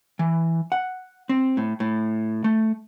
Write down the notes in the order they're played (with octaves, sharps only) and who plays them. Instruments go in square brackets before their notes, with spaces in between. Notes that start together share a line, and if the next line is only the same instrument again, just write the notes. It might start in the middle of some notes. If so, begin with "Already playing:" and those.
[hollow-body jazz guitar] E3
F#5
C4
A2
A2
A3